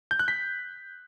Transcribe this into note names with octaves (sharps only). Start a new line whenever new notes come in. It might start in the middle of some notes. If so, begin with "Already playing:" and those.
G6
F#6
B6